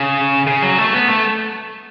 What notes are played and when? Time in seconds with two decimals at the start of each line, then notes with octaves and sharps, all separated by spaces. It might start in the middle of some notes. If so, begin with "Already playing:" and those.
Already playing: C#3
0.47 C#3
0.63 F#3
0.78 A3
0.94 B3
1.09 A3